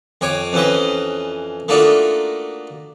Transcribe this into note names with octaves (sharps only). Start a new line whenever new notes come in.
F2 C#5 G#5 D6
F2 E3 C#4 B4 D#5
A3 A#3 D4 D#4 F4 F#4